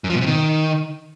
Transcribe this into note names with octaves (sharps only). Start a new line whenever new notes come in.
F#2
F3
B2
C3
D#3